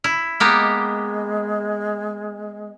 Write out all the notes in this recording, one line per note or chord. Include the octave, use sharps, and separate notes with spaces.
E4
G#3 A#3 B3 G4